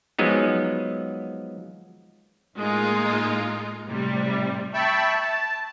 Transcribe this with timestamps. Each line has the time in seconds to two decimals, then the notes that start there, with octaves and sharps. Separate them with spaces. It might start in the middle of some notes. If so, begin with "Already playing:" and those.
0.19 F3 F#3 G#3 B3 D#4
2.56 A2 G#3 A#3 D#4 F4
3.87 A2 C3 G3
4.74 E5 G5 A5 B5 C#6
5.21 A5